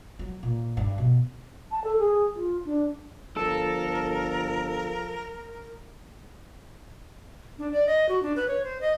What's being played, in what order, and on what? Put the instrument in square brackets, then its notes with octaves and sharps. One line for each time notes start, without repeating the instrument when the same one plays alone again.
[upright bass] F#3
A#2
G2
B2
[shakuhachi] A5
A4
G#4
F4
D4
[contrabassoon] G1 [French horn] F3 [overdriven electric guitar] A4 [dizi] A#4
[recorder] D4
D5
D#5
F#4
D4
B4
C#5
C5
D#5